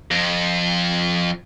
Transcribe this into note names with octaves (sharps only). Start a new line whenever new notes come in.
F2